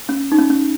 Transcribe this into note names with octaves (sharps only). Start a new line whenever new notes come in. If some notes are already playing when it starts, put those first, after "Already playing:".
C#4
D#4
C#4
C#4